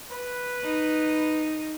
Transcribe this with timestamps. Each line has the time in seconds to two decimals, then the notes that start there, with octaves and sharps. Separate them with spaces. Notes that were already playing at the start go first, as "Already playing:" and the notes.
0.11 B4
0.63 D#4